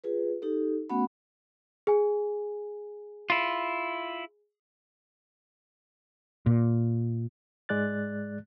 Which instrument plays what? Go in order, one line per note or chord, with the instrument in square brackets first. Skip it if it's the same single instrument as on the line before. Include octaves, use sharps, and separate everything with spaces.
[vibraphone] F4 G#4 B4
D#4 G4 A4
A3 B3 C#4 F#4 F#5 B5
[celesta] G#4 G#5
[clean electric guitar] E4 F4
[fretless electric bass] A#2
[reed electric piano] G#2 G#3 D5 F#6 A6